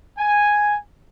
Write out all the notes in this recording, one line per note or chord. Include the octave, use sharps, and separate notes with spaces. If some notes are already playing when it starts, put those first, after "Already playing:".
G#5